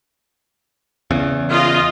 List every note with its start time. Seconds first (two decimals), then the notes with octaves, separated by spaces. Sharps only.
1.11 E2 C#3
1.49 F4 D#5